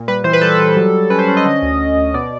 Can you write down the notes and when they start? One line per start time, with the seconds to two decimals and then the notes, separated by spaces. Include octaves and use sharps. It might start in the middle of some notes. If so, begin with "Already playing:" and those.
Already playing: A#2
0.08 G3 B4
0.24 E3 C5
0.33 B4
0.41 G3 A4
0.60 G3
0.77 F#3
0.94 F#3
1.10 C#4 B4
1.19 C5
1.28 C#4
1.37 D#5
1.46 D3
1.63 D2
1.80 D2
1.97 D2
2.14 B2 D5